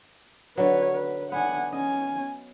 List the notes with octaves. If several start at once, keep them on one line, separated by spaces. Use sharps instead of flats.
D3 F#3 B4 C#5
B4
B3 D4 F#5 G#5
C#4 D#5 G#5